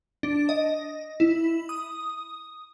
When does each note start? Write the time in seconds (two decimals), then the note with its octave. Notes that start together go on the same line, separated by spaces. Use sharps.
0.23 D4
0.49 D#5
1.20 E4
1.69 D#6